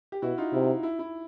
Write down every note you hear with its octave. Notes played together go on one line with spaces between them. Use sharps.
G4
B2 E4 F#4
D#4 F4
C3 E4
E4
E4